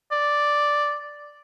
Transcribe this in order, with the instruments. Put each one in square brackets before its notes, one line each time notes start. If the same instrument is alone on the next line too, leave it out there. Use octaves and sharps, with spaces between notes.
[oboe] D5